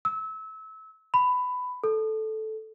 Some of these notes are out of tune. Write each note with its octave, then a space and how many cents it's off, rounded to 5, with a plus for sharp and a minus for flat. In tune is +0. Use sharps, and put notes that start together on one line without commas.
E6 -25
B5 +15
A4 -10